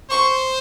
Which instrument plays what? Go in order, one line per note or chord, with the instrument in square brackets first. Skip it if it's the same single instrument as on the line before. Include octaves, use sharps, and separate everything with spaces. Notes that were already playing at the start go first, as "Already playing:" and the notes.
[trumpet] C5 [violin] C#6